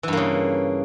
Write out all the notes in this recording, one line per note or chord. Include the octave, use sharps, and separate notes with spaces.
G2 C#3 E3 A#3